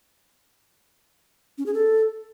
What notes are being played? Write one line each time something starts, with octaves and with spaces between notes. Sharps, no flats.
C#4
G#4
A4